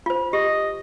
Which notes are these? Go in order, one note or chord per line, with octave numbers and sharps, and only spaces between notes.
F4 C5
G4 D#5